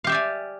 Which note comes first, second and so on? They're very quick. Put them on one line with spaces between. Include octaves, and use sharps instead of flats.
F5 G4 E5 D5 G#5